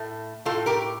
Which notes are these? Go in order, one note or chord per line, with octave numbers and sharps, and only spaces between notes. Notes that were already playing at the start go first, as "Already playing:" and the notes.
Already playing: A2 A3
A2 A3 F4 A4
G4 A#4